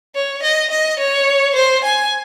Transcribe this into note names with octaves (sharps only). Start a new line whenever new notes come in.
C#5
D#5
D#5
C#5
C5
G#5